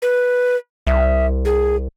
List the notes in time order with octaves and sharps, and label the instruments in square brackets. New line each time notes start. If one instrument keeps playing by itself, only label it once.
[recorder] B4
[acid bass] C2 [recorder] E5
[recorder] G#4